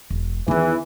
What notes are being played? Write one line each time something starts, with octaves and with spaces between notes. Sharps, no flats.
E1
E2 D#3 E3 D#4